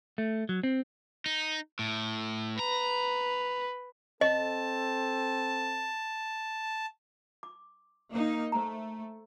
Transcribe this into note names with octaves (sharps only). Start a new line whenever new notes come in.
A3
F#3
C4
D#4
A2
B4 A#5
C4 A4 D#5 A5
D6
A#3 D#4
A3 C5 A#5